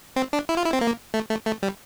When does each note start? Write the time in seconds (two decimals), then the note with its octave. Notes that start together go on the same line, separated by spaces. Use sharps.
0.16 C4
0.33 D4
0.49 E4
0.57 F4
0.65 E4
0.73 C4
0.81 A#3
1.14 A3
1.30 A3
1.46 A3
1.63 G3